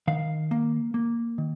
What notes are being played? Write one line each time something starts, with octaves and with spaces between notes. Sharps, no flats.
D#3 F5
A#3
A#3
D#3